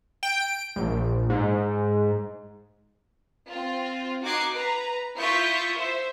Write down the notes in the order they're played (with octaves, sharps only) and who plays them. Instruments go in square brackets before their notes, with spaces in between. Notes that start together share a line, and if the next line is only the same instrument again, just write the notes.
[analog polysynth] G5
D7
A#1
G#2
[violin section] C4 F4
D#4 F#4 D6 F#6 G#6 C7
B4 A#5
E4 F4 C#6 D#6 G6 B6
C5 E5